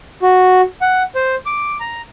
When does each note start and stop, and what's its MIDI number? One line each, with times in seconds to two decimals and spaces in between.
0.22 0.61 66
0.81 1.03 78
1.15 1.35 72
1.46 1.77 86
1.80 2.01 82